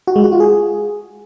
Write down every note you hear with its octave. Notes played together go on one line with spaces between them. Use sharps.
F#4
G#3
F#4
F4
G#4